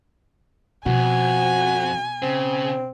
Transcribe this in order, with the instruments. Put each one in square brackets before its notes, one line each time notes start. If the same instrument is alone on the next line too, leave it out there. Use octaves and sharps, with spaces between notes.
[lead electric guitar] F2 [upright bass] B2 [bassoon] F#4 [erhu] G#5
[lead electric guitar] C#3 [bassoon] C4